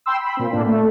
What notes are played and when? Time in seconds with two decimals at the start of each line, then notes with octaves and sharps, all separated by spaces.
0.06 G5 B5 C6 E6
0.21 B5
0.37 A#2 C4
0.52 A2 A#3 D4
0.66 A3